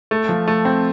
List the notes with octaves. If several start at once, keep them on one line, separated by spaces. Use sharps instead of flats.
A3
F3
A3
C4